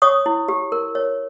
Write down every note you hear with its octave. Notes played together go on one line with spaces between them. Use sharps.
C#5 C#6 D#6
E4
G4
A#4
C#5